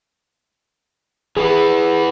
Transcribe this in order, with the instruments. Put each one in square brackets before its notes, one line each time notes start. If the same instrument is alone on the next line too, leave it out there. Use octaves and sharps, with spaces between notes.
[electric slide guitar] E3 B3 [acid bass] G#4